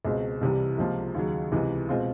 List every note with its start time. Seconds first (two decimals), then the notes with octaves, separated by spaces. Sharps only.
0.05 C#2 B2 G#3 C4
0.41 C2 C3 E3 G3
0.78 C#2 C3 F3 A#3
1.15 D#2 C#3 F#3
1.52 C#2 C3 E3
1.89 B2 G#3 C4 F4 G#4